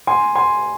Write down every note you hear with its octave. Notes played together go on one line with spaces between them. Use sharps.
G#5 C6
G#5 C6